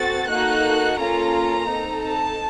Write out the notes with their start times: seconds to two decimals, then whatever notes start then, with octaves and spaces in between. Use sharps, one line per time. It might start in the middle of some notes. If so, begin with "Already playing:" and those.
Already playing: C4 F#4 A4 A6
0.29 A#3 D#4 F#4 A4 F#6
0.99 A#3 C#4 F4 A4 A#5
1.70 C4 D#4 A4
2.05 A5